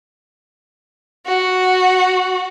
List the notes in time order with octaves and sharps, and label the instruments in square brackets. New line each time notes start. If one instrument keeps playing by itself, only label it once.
[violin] F#4